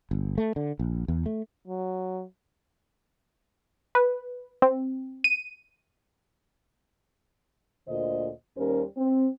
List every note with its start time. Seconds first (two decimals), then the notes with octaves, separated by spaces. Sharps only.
0.11 G1
0.38 A3
0.56 D3
0.79 A#1
1.08 E2
1.26 A3
1.67 F#3
3.95 B4
4.62 C4
5.24 D#7
7.87 D2 A#2 D3 C5 D#5
8.57 D#2 G3 C#4 A#4 C5
8.97 C4